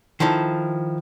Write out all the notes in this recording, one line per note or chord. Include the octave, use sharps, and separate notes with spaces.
D#3 F3 E4 A4